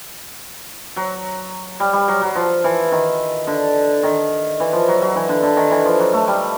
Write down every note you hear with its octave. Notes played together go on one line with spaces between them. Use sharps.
F#3
G3
G3
F#3
F#3
F3
E3
D#3
D3
D#3
E3
F3
F#3
F#3
E3
D3
D3
D#3
E3
F3
F#3
A3
G3